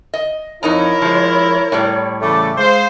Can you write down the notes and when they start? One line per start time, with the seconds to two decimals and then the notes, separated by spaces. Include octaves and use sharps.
0.14 D#5
0.63 F2 D#4 E4 A#4 C#5 A#5
1.02 F3 G#3
1.72 A2 G3
2.22 C#3 E3 A3 D6
2.58 G#3 C5 F5